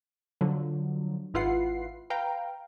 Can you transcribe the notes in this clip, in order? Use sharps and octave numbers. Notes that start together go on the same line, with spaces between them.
D3 F3 F#3
G#1 E4 F4 B4 F#5 C7
B4 F5 G5 A#5